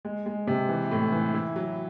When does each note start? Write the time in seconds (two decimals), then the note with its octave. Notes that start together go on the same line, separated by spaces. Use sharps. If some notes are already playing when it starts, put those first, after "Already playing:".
0.05 G#3
0.26 G#3
0.47 C3
0.69 E3
0.91 A2
1.12 E3
1.34 E4
1.56 F#3